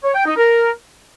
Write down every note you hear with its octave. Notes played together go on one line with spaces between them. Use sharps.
C#5
G5
D#4
A#4